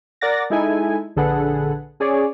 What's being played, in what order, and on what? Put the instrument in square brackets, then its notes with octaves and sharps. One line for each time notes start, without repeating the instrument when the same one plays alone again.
[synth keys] A#4 D5 F#5 A6 A#6
G#3 D#4 E4 A4 G#5
A#1 D3 G#4 A4 B4 F#5
C#4 G#4 C#5 D5